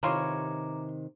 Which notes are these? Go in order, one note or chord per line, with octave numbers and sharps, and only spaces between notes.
C3 D#3 E3 F4 C#5 A#5 D6